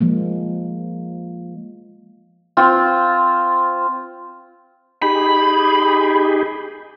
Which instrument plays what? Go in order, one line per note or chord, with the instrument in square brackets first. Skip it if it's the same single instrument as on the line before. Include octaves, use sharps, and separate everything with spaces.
[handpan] F3 G#3 A#3
[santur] C4 F4
[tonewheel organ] D#4 G4 G#4 [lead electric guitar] B5